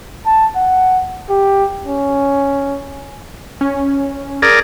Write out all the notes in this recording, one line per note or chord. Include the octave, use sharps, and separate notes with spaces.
A5
F#5
G4
C#4
C#4
G#4 A#4 D5